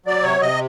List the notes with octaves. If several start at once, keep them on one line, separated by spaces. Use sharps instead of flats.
F#3 D5
C3 C#5
C3 D#5